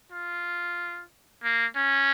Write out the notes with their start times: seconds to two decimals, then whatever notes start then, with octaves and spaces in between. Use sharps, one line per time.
0.12 F4
1.43 A#3
1.76 C#4